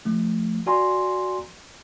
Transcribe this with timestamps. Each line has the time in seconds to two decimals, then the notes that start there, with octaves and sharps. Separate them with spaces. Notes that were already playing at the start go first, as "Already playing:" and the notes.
0.05 F3 A3
0.66 F#4 D5 G#5 A#5 C6